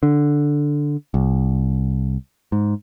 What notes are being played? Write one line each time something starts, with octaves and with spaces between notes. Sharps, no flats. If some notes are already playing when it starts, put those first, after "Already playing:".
D3
C2
G#2